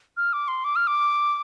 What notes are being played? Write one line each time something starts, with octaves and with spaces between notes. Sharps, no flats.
F6
D6
C6
D6
F6
D6